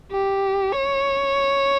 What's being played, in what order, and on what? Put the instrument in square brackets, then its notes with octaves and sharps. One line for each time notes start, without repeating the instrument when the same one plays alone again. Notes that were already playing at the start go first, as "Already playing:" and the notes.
[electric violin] G4
C#5